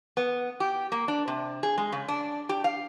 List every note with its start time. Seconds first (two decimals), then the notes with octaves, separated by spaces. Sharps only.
0.17 B3
0.60 G4
0.92 A#3
1.08 D4
1.28 C3
1.63 G#4
1.78 G#3
1.92 C#3
2.08 D4
2.49 G4
2.64 F5